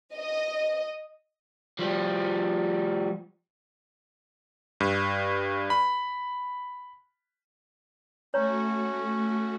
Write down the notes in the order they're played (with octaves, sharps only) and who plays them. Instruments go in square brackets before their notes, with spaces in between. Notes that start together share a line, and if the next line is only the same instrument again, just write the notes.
[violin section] D#5
[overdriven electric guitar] F3 G3
[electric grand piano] G2
B5
[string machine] A3 F#4 [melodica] C#4 [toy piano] C#5 A#5